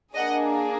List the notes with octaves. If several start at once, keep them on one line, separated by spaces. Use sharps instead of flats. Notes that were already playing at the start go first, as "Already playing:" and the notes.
A#3 D4 G#4 D#5 F#5